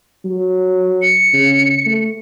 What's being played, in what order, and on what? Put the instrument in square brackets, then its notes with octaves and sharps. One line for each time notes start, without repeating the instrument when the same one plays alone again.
[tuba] F#3
[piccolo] C#7
[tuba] C#3
A3